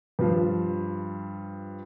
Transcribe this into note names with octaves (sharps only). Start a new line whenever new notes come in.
G2 F3